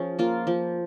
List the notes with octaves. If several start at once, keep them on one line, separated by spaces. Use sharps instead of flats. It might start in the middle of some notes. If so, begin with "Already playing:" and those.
Already playing: F3 C#4 G#4
A#3 F4
F3